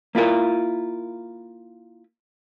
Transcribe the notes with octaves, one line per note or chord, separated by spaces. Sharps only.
A#3 E4 F4 A#4